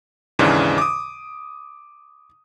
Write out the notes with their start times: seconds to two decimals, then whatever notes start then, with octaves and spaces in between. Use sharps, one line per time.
0.39 D#2 G#2 C#3 E3 D4
0.78 D6 D#6